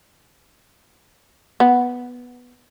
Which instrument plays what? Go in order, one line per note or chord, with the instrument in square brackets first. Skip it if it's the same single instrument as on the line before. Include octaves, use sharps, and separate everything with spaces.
[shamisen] B3